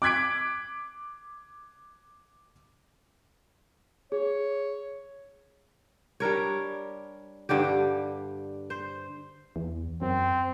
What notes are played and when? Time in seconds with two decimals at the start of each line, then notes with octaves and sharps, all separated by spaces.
0.02 D6 F#6 G#6 B6 D7
4.12 G#4 C#5
6.20 G3 D4 A#4 C#5
7.49 G2 D3 G3 G4
8.70 C5
9.56 E2
10.02 F#2 C4